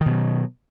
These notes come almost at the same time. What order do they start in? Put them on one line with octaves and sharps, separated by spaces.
D#3 B2 F#3